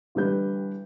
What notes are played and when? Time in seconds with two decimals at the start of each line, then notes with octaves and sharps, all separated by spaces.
0.15 A1 D3 G3 B4 G6